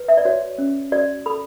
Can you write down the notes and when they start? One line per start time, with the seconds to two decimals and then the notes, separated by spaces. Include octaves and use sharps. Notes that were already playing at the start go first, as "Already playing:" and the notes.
Already playing: B4
0.08 E5
0.17 D5
0.25 F#4 C#5
0.58 C#4
0.92 F#4 D5
1.26 A4 B5